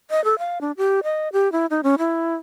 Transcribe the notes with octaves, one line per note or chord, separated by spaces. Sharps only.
D#5
A4
F5
D4
G4
D#5
G4
E4
D#4
C#4
E4